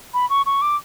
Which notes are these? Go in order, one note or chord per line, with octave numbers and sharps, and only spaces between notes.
B5
C#6
C#6
D6